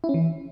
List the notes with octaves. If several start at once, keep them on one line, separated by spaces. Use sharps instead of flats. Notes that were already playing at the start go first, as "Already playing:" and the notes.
E4
C#4
E3